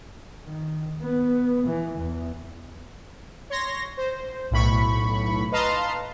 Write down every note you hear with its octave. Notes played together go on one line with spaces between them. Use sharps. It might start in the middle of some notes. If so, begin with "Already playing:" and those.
D#3
B3
E3
E2
C#5 C6 A#6
C5
B1 A2 B5 C#6
B4 D#5 F5 A5 A#5 C6